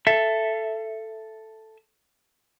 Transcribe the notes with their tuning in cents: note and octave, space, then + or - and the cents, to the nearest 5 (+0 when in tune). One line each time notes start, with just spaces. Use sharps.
A4 +0 E5 +15